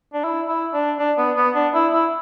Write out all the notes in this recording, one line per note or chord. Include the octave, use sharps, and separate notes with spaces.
D4
E4
E4
D4
D4
B3
B3
D4
E4
E4